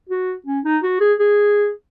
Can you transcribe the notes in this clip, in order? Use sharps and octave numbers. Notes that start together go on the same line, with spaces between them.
F#4
C#4
D#4
F#4
G#4
G#4